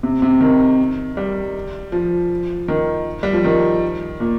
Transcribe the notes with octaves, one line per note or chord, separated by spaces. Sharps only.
C3
C3
D#3
G3
F3
D#3
G3
F3
D#3
A#2